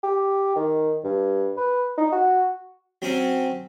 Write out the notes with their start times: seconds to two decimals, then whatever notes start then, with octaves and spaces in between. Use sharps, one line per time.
0.03 G4
0.55 D#3
1.04 G2
1.57 B4
1.97 D#4
2.12 F#4
3.02 F#3 C4 C#4